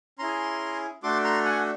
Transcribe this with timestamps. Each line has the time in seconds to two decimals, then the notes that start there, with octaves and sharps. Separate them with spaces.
0.19 C#4 E4 G#4 A#5 C6
1.03 A3 D4 F#4 A4 C6 D6
1.24 A#5 C6
1.45 F#5 G#5